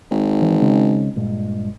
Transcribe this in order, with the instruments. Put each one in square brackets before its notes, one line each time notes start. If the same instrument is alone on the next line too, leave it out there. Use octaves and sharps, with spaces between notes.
[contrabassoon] G#1
[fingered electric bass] E3
C#3 G#3 C#4
G2 A#2 G#3